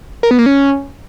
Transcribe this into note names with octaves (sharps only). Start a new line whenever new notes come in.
A#4
B3
A#3
C#4